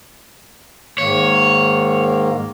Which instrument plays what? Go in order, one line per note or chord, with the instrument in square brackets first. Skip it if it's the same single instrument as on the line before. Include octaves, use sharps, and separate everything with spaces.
[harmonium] G#2 D#3 A#3 [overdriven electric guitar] C#5